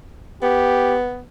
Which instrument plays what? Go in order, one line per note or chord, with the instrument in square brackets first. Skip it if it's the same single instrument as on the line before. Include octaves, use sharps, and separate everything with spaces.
[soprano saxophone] B3 [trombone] G4